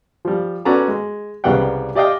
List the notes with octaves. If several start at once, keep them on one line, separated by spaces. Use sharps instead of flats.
F3 G3
B3 C#4 F#4 A4 D5 A#5
G#3
C2 C#3 G3 B3 F#5 G5
G4 D5 D#5 F5 G5